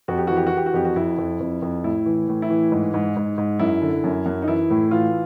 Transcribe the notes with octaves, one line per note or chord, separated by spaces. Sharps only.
F2 F#4
G4
E3 F#4
G4
F#4
E3 G4
F#4
F2 G4
F#4
F2 E4
F2
F2
F2
A2 E4
E3
A2
E4
E3
G#2
G#2
G#2
G#2
F#2 E4
D3
F#2
F#2
D#4
E3 E4
A2
E3 F4